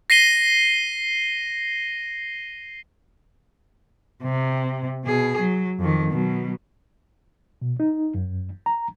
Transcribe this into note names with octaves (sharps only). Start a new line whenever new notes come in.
A#6 C7 D#7 G7
C3
B2 G#4
F#3
F2 D#3
B2 F#3
B2
D#4
F#2
A#5